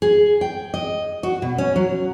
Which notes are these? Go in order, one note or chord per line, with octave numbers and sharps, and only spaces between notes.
G#4
G5
D#5
F#4
B2
C#4
F#3